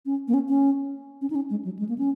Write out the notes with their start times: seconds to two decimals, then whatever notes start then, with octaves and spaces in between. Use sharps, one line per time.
0.06 C#4
0.28 A#3
0.34 C#4
0.48 C#4
1.21 C#4
1.30 D#4
1.35 C#4
1.50 G#3
1.65 F#3
1.79 G#3
1.89 A#3
1.98 C#4